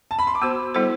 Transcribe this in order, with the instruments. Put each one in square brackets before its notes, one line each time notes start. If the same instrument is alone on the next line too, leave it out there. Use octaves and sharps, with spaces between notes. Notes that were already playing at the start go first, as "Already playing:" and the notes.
[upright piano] A5
B5
C6
D6
[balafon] B3 F#4 C5 [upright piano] E6
[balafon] G3 B3 E4 A4 C5